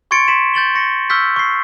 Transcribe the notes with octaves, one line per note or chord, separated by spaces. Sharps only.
C6 C#6 G#6 A6 C#7 D7
C6 B6 E7
G6 A6 F#7 G7
C#6 A#6 C#7
C#6 E6 F6 G6 B6
C#6 C7